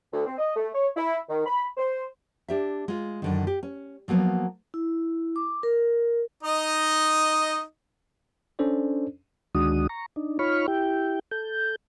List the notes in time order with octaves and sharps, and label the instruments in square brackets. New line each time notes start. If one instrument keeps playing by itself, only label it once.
[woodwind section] D2
C4
D#5
A3
C#5
E4
D#3
B5
C5
[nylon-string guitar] D4 G4 E5
G#3 F4
F#2 D3 D#3
G4
C#4
F3 F#3 A#3 B3
[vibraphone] E4
D6
A#4
[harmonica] D#4 D#5
[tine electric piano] C#4 D4 A4 C5 D5
[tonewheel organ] D2 D#3 G#3 D4 F#4 D#6
A#5 C#6
D4 D#4
D#4 F4 C#5 B5 C#6 F6
E4 G4 G5
A4 G6